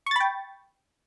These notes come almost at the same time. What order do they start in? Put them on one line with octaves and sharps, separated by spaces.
C#6 A6 B5 G5